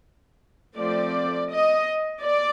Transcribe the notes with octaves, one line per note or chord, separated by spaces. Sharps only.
F3 A3 C4 D5
D#5
D5